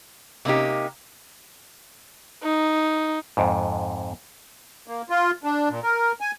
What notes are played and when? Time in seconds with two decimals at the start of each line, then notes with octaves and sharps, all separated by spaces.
0.45 C3 A#3 C#4 D#4 G4
2.43 D#4
3.37 F2 G#2
4.88 A#3
5.10 F4
5.44 D4
5.69 A#2
5.83 A#4
6.21 G#5